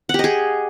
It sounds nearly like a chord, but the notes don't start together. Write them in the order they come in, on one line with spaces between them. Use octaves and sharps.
F#5 G4 D#5 G#4